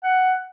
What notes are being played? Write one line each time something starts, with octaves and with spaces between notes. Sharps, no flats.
F#5